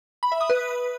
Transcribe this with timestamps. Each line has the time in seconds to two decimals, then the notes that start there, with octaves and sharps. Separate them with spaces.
0.23 B5
0.32 E5
0.41 D#6
0.50 B4